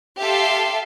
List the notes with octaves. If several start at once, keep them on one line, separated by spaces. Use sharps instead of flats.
G4 A4 E5 F5 C6